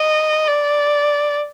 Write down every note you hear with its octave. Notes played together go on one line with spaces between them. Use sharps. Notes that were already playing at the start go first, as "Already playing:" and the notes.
Already playing: D#5
D5